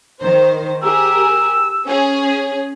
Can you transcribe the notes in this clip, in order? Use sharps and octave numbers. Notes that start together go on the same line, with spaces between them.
D#3 C5
G4 G#4 A#4 E6
C#4 G#4